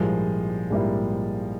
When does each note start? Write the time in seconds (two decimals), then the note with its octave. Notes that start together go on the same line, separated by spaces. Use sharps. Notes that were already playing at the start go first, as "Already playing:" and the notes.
Already playing: A#1 G#2 F3 G3 G#3 A#3 E4
0.70 A#1 G#2 G3 A#3 E4